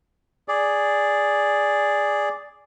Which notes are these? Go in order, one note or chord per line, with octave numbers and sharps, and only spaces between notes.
G#4 D5